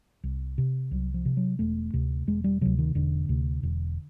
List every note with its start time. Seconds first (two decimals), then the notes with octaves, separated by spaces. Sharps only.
0.24 C2
0.58 C3
0.91 C2 F#3
1.14 F3
1.25 C3
1.37 F#3
1.59 E1 A3
1.94 D2 C3
2.27 E1 G#3
2.44 G3
2.61 D2 C3 F#3
2.78 D#3
2.95 E1 D3
3.29 D2 C3
3.63 E1